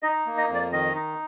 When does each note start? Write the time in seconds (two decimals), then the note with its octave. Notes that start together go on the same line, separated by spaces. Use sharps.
0.03 D#4 D#5
0.26 A#3
0.38 D#5
0.49 F2
0.55 D5
0.73 D#3 D#5
0.95 D#4